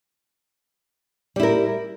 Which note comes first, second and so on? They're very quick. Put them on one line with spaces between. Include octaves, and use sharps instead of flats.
G3 E4 A#4